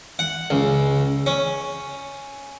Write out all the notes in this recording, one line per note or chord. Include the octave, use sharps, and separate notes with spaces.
F#5
C#2
C#4